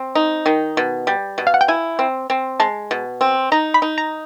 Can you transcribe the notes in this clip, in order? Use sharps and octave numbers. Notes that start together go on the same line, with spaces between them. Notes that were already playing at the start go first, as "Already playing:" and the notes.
Already playing: C4
D#4
D#3
B2
G3
B2
F5
F#5
G5
E4 G#5
C4
C4
G#3 A5
B2
C4
D#4 A#5
B5
D#4
A#5